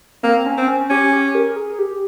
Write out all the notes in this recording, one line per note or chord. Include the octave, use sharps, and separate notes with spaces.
A#3 C4
C#4
C4
C#4
C#4 G4
G4
A#4
G#4
G4